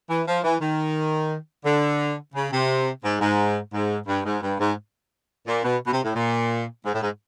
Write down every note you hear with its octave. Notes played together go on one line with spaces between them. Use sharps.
E3
F3
E3
D#3
D3
C#3
C3
G#2
G#2
G#2
G2
G#2
G2
G#2
A#2
B2
B2
C3
A2
A#2
G#2
A2
G#2